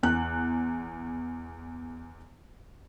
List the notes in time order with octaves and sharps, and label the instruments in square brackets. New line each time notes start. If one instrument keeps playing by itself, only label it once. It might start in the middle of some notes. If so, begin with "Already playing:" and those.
[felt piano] E2 F#6